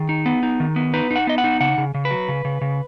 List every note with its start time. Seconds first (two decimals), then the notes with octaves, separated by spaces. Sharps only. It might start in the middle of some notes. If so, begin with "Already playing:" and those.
Already playing: D#3 G#4
0.09 D#4
0.26 B3
0.43 D#4
0.60 D#3
0.76 B3
0.94 D#4 B4
1.11 D#4
1.16 F#5
1.27 B3 D#5
1.38 F#5
1.44 D#4
1.60 C#3 F#5
1.78 C#3
1.94 C#3
2.05 B4
2.11 F#3
2.28 C#3
2.45 C#3
2.61 C#3